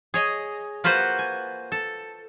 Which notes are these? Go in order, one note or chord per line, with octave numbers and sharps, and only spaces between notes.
G#4 C#5 D#5
A#3 F4 F#4 B4 C5
G#5
A4